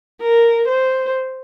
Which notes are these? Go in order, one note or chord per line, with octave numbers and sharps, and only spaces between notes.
A#4
C5